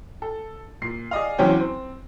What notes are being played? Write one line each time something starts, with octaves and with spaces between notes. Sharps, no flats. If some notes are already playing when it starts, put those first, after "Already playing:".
A4
A#2 C7
G#4 D5 D#5 F5
E2 F#3 C4 C#4 G5
C4